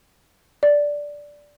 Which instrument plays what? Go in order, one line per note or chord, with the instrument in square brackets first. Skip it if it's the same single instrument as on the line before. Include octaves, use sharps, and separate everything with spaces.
[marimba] D5